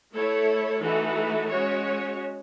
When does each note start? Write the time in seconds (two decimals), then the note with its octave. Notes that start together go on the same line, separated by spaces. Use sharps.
0.13 A3 E4 A4 C#5
0.80 E3 A3 D#4 F#4 A4
1.48 G#3 C#4 F#4 C#5